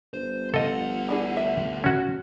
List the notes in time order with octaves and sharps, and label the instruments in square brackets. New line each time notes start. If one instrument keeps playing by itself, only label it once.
[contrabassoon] G1 [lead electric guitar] C5
[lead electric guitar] D2 F#5 [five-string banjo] F3 [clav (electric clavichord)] A4 D#5
[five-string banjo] E3 D4 G#4
E5
[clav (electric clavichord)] C#4 F#4